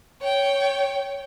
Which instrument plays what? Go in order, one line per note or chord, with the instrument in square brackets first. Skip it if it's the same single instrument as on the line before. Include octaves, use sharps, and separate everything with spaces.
[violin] C#5 G5